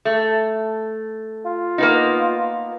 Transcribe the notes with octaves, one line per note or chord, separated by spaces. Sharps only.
A3
F4
A#3 B3 D#4